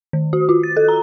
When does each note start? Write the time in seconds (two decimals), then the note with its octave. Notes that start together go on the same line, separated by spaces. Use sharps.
0.13 D#3
0.33 F#4
0.49 F4
0.63 A6
0.77 A4
0.89 A#5